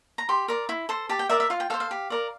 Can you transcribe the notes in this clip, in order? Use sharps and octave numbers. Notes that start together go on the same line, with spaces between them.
A#5
G4 C6
A#4 D5
E4
A4 C5
G4 A5
G5
A#4 D5 E5
E5
F4 F5
G5
A4 C5 F5
F5
G4
A#4 D5